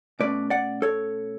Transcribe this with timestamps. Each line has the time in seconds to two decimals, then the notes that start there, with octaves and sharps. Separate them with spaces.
0.20 B2 A3 C#4 B4 D5
0.50 D5 F#5
0.82 A4 C#5